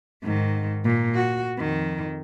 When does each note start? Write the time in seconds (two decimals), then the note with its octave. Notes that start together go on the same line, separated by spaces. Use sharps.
0.23 G#2 D#3
0.85 A#2
1.14 F#4
1.58 F2 D#3